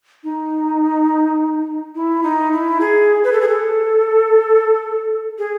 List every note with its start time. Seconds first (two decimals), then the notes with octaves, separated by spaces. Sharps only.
0.24 D#4
1.95 E4
2.23 D#4
2.53 E4
2.81 G#4
3.24 B4
3.32 A4
3.41 G#4
3.48 A4
5.38 G#4